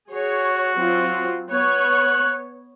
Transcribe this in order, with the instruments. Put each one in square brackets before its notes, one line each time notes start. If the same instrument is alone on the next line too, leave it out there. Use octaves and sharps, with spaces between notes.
[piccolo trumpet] F#4 [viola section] G#4 C#5
[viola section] F#3 C4 F4
[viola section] B3 C#5 [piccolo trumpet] F#6